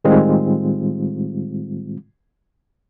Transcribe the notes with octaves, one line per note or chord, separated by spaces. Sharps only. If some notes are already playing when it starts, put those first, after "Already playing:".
A2 D#3 G3 G#3 C4 F4